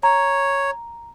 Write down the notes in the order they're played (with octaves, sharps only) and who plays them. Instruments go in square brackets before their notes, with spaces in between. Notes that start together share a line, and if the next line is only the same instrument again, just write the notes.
[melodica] C#5 [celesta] A#5